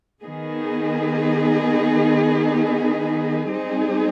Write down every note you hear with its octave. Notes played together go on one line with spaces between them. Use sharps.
D#3 B3 D#4 G#4
G3 C4 D#4 G#4